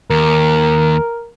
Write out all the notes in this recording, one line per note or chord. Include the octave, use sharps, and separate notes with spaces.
D#2 A#4